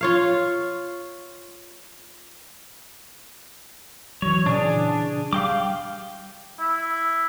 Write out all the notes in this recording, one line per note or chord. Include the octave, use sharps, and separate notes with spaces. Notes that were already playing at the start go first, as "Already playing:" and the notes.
F4 C#5 F5
E3 F#3 C#5
A#2 C#3 E3 D4 G#4
G3 F5 G5 D6
E4